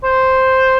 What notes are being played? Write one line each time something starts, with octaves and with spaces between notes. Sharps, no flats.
C5